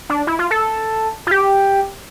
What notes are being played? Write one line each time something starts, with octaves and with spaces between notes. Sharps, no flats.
D4
E4
F4
A4
F4
G4